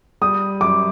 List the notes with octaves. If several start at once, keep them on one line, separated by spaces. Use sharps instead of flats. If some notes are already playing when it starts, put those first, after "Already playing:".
G3 D#6
F#2 D6